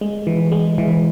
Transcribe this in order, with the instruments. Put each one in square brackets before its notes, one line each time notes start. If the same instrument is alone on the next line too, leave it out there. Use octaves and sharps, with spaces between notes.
[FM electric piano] G#3
E3
G#3
E3